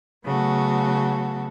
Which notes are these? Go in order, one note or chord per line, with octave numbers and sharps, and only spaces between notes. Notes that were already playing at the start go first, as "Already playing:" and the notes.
C#3 F#3 A3 B3 F#4 A4